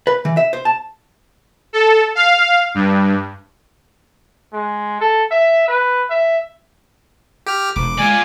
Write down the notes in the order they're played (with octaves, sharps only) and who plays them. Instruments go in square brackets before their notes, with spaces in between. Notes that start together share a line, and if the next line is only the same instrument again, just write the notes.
[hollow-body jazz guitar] B4
E3
E5
C5
A5
[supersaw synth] A4
F5
G2
[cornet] G#3
A4
E5
B4
E5
[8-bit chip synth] G4 F6
[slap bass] E1 F3 [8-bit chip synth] D6
[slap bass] G#3 [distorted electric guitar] F4 D5 [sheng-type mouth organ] G#5